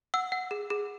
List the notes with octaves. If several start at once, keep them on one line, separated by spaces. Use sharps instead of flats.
F#5 E6
F#5
G#4
G#4